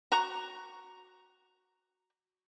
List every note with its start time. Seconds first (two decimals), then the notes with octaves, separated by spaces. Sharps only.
0.12 F#4 A#5 C#6